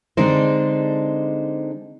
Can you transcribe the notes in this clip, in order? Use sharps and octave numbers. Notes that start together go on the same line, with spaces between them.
D3 G#3 C4 D4 D#4 C5